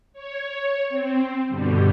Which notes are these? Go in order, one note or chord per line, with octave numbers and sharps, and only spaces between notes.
C#5
C4
G2 B2 D3 G3